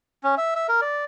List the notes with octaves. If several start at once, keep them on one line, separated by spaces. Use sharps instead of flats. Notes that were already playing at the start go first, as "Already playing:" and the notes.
C#4
E5
E5
A#4
D5